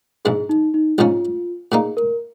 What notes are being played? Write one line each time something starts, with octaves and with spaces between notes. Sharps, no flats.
A#1 G#2 G#3 G#4
D#4
D#4
A#1 G#2 F3 C#4 F4
A#2 A#3 D#4 G#4
A#4